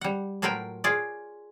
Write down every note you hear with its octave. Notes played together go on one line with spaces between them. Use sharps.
G3 F#5
A2 F#3 F4 A#4 B4 G5
F4 G#4 C#5 D5